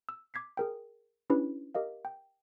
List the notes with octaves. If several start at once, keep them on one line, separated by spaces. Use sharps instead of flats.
E6
D6 G#6 B6 C7
G#4 A#4 G5
C#4 D4 E4 G4 B4 C#5
G4 A#4 D#5 F5
G5